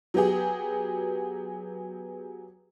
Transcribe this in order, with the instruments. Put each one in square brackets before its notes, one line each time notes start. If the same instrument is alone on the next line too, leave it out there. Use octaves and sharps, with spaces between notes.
[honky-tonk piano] F#3 B3 G4 G#4